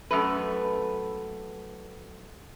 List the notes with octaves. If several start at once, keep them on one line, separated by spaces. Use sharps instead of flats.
F#2 A3 B4